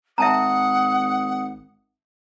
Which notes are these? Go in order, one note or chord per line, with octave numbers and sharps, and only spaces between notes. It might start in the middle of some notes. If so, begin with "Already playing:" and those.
G#1 E5 F#5 A5 A#5 D#6